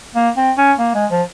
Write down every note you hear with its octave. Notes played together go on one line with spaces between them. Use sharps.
A#3
C4
C#4
A#3
G#3
F3